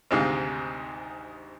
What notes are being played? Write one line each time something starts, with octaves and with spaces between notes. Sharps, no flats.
G#1 D2 G#2 C3 D#4 F5